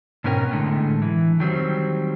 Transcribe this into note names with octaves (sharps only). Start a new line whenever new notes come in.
G#2 B2 B3 C#4 A#4 G5
A2 D3 G#3
E3
D#3 F#3 G3 C4